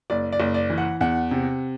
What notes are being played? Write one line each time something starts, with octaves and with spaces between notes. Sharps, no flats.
F#1 D5
D5
F#1
D5
E3
F#5
E2 F#5
C3